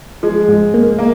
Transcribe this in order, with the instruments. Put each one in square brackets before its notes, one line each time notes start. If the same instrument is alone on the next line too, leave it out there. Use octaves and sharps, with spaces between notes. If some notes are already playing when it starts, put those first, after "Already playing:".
[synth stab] F3 [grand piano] G#3
[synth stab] G#2
A#3
[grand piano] A#3